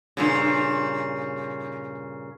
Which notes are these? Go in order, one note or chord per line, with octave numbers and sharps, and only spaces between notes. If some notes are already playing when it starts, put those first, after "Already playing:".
G2 A#2 C#3